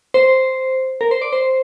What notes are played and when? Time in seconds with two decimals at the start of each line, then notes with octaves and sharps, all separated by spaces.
0.14 C5
1.01 A#4
1.11 C5
1.22 D5
1.33 C5